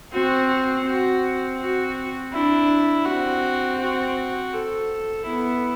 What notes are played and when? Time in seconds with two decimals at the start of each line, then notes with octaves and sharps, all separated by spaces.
0.12 C4 F#4
0.86 C4 F#4
1.59 F#4
2.32 D4 E4
3.06 C4 F#4
3.80 F#4
4.54 A4
5.27 B3 E4